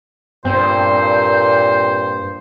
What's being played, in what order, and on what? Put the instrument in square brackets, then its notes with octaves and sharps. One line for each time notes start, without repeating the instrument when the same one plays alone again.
[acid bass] G2 [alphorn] A#2 [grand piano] C4 [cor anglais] C5